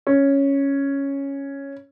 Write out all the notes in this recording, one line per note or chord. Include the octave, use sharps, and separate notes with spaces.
C#4